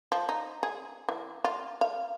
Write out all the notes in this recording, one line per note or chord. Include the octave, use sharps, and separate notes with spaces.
F3
D#4
G#4
E3
F4
F5